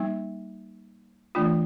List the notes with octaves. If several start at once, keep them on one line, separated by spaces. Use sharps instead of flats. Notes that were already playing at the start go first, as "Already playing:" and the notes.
Already playing: G3 A#3 D#4
E3 A3 D4 F4